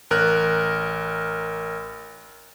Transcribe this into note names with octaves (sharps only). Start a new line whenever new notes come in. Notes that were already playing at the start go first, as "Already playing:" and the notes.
A1 A#4 F#6